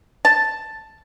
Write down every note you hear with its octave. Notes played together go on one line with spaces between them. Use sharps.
A5